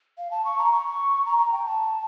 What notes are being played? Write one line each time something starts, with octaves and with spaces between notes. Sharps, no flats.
F5
A5
C#6
A#5
C#6
A#5
A#5
G5
A5